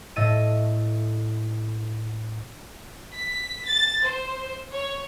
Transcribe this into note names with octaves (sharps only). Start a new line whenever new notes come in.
A2 A3 D#5 E6 A6 D#7
B6
A6
C5
C#5